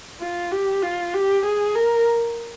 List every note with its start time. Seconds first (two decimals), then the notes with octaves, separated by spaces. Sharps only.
0.20 F4
0.51 G4
0.82 F4
1.14 G4
1.45 G#4
1.75 A#4